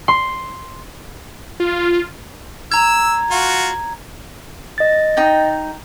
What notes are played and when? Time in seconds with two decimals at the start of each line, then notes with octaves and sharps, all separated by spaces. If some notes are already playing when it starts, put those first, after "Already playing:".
0.08 C6
1.60 F4
2.72 A#5 E6 G#6
3.31 F4 F#4
4.78 D#5 A6
5.17 D#4 G5